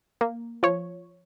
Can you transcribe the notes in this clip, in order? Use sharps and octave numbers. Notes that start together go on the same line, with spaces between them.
A#3
F3 C#5